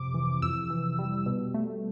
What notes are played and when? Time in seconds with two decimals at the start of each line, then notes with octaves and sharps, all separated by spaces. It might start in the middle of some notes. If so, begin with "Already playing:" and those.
Already playing: F2 C3 D6
0.14 E3
0.42 F2 E6
0.70 E3
0.99 G3
1.26 B2
1.54 A3